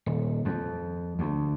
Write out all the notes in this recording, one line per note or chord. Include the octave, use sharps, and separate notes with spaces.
D#1
F2
D2